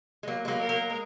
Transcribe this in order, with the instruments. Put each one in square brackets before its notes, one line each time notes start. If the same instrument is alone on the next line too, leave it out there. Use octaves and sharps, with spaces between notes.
[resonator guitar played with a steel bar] G#3
F#3 A#3
G#3
F#3 A#3
[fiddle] A#4
[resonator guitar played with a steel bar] F#3 A#3
G#3